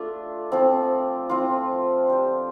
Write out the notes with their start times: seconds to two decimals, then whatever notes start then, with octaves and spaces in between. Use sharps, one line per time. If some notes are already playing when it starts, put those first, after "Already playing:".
Already playing: A3 D4 F4
0.52 F3 C4 F4
1.29 F3 C4 F4
2.08 D4 G4 C5